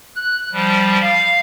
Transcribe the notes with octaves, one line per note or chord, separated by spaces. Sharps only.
F#6
F3 G3
F5